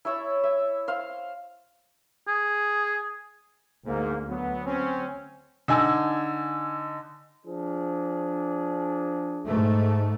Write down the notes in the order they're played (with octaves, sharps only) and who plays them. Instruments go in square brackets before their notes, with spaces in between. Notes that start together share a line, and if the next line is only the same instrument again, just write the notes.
[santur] E4 C#5 E5 A5
E5
C5 F5
[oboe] G#4
[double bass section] D2 [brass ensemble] G#2 [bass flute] A#3
[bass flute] F#3 [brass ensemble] B3
[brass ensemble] C4 C#4
[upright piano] D3 D#4 G#5 E6
[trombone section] F3 D4 G#4
[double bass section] G#2 A3